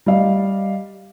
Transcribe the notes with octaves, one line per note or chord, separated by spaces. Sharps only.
G3 D5 D#5 F5